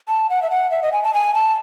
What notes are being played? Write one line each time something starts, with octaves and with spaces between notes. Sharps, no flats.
A5
F#5
E5
F#5
E5
D#5
G#5
A5
G#5
A5